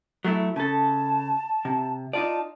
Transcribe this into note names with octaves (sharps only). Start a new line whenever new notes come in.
F#3 A3 E4
C#3 A4 A5
C3
D#4 F4 D5 A5